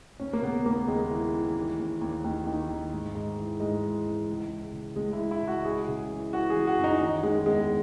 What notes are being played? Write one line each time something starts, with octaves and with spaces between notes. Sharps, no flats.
D#2 C#4
A#3
C#3 B3
D#2 A#3
D#2 G#3
E3
E3
D#2
D#2
D#2
D#2
D#3
D#3
G#2
G#2
E3
G#2 G#3
E3
E3
C#2
E3
C#3
C#2 G#3
E4
E3
E4
C#2 F#4
E3 G#4
C#3
E3
E3 F#4
G#4
E3
F#4
F#2
D#4
D#3
D#3 G#3
E2 G#3